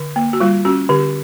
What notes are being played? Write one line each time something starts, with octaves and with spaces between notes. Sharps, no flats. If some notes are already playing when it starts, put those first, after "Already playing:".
Already playing: D3
A#3
F#4
G3 F4
C#4 F#4
D3 G4